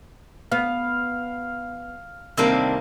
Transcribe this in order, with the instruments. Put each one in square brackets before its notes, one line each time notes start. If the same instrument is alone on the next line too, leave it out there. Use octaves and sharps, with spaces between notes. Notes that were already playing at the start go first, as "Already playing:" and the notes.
[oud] B3 [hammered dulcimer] F5
[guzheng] C3 G3 A#3 [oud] D#3 [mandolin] C4 D4 G5